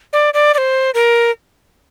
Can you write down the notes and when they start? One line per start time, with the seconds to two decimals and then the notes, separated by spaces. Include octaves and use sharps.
0.13 D5
0.34 D5
0.54 D5
0.58 C5
0.94 A#4